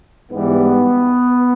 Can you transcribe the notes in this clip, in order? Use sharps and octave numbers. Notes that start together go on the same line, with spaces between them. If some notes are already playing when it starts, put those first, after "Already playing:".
G#2 E3 G3 B3